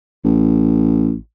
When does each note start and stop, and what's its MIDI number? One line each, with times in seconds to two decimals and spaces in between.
0.25 1.16 33